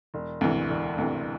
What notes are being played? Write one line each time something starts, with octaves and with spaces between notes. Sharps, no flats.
E1
D2 C3 E3
E1
D2 C3 E3